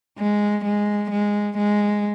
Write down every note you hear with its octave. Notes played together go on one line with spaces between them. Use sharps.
G#3
G#3
G#3
G#3